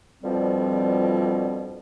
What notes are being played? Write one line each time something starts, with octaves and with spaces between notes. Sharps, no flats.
F2 B2 D3 F3 G3 C4